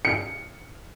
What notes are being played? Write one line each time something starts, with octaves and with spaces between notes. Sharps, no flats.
C#7